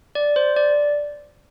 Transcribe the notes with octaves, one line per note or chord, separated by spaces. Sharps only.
D5
C5
D5